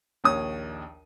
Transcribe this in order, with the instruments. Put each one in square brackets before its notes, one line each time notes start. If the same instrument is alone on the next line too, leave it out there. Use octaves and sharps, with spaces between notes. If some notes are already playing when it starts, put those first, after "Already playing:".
[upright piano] A#1 D#2 C#5 D#6